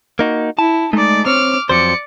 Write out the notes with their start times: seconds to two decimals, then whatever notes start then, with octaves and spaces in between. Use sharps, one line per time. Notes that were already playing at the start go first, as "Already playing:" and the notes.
0.19 A#3 D#4 F#4
0.59 E4 A5
0.93 G#3 A3 D#4 D5
1.26 C4 C#5 D6 F6
1.69 F2 F#3 C5 D5 C#7